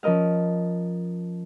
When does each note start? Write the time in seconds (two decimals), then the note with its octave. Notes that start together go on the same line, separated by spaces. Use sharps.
0.03 F3 C#4 A#4 D#5 F5